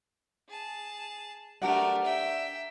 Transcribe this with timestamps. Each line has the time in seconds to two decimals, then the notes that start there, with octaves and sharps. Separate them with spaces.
0.49 G#4 A5
1.62 A3 D4 G4 A#4 F#5
2.04 E5 G5